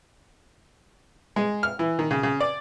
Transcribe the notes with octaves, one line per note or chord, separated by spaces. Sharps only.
G#3
F6
E3
D#3
C#3
C#3
D5